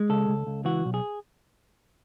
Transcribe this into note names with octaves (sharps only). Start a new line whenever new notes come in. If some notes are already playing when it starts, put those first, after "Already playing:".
Already playing: G#3
C#2 A4
C#2
C#2
E3 F#4
B1
G#4